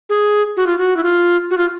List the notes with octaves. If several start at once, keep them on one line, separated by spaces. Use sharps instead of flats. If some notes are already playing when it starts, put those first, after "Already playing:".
G#4
F#4
F4
F#4
E4
F4
F#4
F4